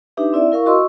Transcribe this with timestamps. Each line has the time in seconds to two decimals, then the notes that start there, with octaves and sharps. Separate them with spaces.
0.17 D4 D#4 G4 B4 E5
0.33 C4 E4 D5 E5
0.52 E4 A#4 F5 C#6
0.66 F#4 D#5 C6 C#6 E6